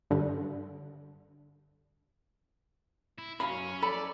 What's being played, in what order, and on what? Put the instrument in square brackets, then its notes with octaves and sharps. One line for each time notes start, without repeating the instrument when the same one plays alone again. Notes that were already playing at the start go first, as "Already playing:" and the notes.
[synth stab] G2 D3
[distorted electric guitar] E4
[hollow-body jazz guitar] F#2 F5 B5 [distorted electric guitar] C#4
[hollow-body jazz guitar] A4 [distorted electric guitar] D5 [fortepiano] B5